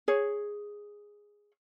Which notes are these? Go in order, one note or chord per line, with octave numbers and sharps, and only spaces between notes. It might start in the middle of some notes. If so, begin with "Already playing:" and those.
G#4 C#5